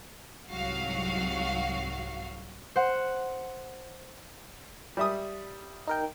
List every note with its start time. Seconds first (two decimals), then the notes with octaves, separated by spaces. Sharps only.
0.48 C2 G#2 F#3 F#4 F5
2.76 C5 F#5
4.97 G3 E5 D#6
5.88 D#4 A#4 G5